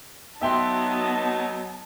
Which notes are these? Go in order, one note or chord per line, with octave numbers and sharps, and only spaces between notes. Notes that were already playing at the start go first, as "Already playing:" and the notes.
F#3 B3 D#4 E5 G5 A5 C6